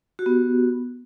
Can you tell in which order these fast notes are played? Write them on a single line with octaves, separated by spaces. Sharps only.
F#4 G4 B3